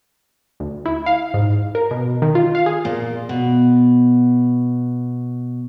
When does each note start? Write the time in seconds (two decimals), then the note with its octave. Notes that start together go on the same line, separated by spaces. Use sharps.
0.60 D2
0.85 E4
1.06 F5
1.34 G#2
1.75 A#4
1.91 B2
2.22 D#3
2.35 F4
2.55 F5
2.66 G#4
2.85 A#2
3.29 B2